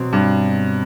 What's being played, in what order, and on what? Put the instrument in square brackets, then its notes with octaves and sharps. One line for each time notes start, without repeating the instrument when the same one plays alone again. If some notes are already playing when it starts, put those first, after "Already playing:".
Already playing: [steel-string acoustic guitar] B2 F#3 C4
[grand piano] G2